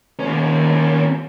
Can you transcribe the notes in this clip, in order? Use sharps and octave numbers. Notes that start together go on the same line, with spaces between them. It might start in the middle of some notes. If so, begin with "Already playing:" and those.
D#2 C#4